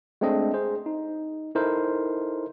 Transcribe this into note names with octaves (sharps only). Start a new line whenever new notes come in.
G#3 A3 C4 D4 D#5
G#4 C5
D#4
D#4 E4 A4 A#4 C5